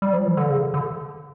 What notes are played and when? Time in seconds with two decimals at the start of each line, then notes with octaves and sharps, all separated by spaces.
0.02 G3
0.13 F3
0.26 E3
0.37 D3
0.50 C#3
0.74 D3